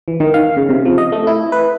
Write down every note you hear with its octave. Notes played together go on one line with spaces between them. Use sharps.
E3
D#3
F5
C#3
C3
F3
D#5
A3
E4
B4